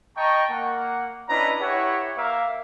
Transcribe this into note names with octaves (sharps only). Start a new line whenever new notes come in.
D#5 G5 A5 A#5 C#6
A#3 F#5
C#4 D4 E4 B4 D#5 A#5
E4 G4 B4 C#5 E5 F#5
A#3 A#4 E5 F5